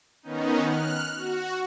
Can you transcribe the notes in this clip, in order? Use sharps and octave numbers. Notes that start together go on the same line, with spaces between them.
D#3 B3 C#4 D#4
F6 F#6
F#4